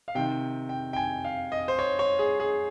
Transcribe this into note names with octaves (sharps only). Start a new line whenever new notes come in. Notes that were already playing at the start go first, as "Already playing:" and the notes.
F5
C3 D#3 G5
G5
G5
G#5
F5
D#5
C5
C#5
C#5
G#4
G#4